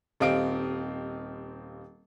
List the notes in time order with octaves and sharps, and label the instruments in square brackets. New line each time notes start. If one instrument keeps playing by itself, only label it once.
[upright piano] D#1 C4 G4 D#5 F5 D7